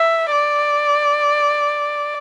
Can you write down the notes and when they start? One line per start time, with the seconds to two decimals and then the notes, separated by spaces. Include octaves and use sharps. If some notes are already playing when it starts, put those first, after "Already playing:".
Already playing: E5
0.31 D5